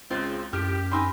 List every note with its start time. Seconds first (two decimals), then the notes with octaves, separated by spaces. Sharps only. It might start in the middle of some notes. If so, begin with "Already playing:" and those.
0.11 C#2 C#3 C4 F4
0.53 F#2 A2 G4 F6
0.92 C4 D#4 G#5 B5 C6 E6